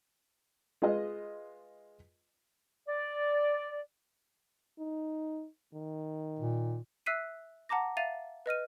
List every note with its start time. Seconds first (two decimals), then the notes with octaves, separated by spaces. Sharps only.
0.82 G#3 F4 B4 D#5
2.87 D5
4.79 D#4
5.74 D#3
6.39 A#2
7.06 E5 E6 F#6 B6 C7 D#7
7.69 F#5 A5 A#5 D6 A#6
7.97 E5 F5 A6 D#7 F7
8.46 B4 D#5 F6 D#7